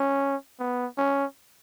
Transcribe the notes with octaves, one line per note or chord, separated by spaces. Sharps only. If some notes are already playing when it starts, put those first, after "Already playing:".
Already playing: C#4
B3
C#4